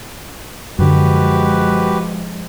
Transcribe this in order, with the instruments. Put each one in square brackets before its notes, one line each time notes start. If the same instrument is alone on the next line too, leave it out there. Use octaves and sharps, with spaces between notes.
[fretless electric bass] F#2 D3 [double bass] F3 G#3 [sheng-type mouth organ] F#4 G4 B4